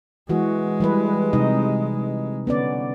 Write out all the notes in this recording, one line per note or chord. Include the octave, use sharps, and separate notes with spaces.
E3 G#3 F#4
E3 G3 B4
C3 D#4 D#5
D3 B3 C#4 D5